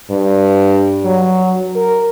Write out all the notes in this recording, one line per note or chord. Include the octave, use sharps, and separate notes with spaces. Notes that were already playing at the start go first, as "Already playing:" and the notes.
G2
F#3
A#4